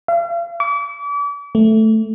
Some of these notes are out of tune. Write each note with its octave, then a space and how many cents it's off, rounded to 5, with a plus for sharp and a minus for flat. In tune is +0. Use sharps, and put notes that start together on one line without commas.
F5 -40
D6 -40
A3 +0